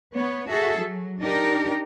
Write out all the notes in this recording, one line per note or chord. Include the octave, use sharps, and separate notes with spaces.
B3 C#5
F#4 G#4 A4 E5
F#3
D4 D#4 G4 A#4